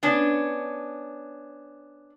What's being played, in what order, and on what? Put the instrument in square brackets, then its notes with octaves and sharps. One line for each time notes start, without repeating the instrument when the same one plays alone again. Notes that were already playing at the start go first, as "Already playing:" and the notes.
[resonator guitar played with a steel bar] B3 C#4 D4